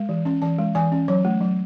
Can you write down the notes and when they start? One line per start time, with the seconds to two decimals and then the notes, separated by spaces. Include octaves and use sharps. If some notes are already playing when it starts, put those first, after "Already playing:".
Already playing: G#3
0.09 E3
0.25 C#4
0.42 E3 A5
0.58 G#3
0.75 E3 G#5
0.92 C#4
1.08 F#3 C#5
1.25 A3
1.41 F#3